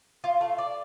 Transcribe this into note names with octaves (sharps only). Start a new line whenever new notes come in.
F4
A3
D5